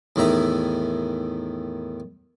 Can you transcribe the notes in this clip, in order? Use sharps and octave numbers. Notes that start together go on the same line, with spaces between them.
E2 A2 D#3 E5 A#5